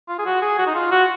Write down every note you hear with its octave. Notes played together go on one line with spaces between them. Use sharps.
F4
G#4
F#4
G#4
F#4
D#4
F4
F#4